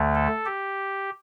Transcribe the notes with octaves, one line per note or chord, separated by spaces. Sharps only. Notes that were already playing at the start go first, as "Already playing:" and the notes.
Already playing: D2 D3 A3
A4
G4